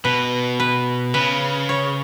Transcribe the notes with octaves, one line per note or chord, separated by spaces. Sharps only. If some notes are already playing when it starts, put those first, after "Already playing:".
B2 B4
B4
C#3 B4
C#5